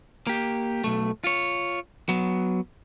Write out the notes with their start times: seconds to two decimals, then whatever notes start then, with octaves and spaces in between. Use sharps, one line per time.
0.27 A#3 G4
0.84 B1 A3
1.24 F4 C#5
2.09 F#3 B3